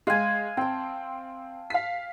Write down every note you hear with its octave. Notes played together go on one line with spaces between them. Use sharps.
G#3 F5 G#5
C4 G5 A5
F5 B6